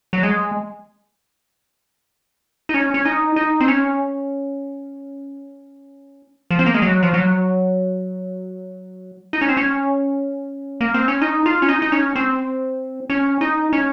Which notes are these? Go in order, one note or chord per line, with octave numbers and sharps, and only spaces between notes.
F#3
G#3
D#4
C#4
C#4
D#4
D#4
C4
C#4
F3
C4
A#3
G#3
F#3
F3
F#3
D#4
C#4
C4
C#4
A#3
C4
C#4
D#4
F4
C#4
D#4
D#4
C#4
C4
C#4
D#4
C#4